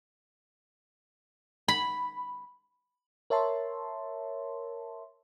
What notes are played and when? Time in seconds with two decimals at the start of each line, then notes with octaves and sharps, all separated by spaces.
1.68 B5
3.30 A#4 C#5 E5 A5 C6